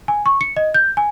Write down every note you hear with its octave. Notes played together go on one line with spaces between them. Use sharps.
G#5
C#6
C#7
D#5
G6
G#5